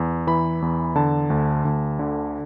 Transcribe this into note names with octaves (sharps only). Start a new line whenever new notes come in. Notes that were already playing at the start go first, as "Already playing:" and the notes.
Already playing: E2
E3 B5
E2
D3 A5
D2
D2
D3